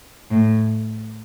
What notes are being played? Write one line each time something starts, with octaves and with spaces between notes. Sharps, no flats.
A2